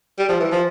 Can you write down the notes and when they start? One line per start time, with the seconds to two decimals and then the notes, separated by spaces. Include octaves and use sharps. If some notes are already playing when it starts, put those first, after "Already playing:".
0.18 G3
0.29 F3
0.40 E3
0.51 F3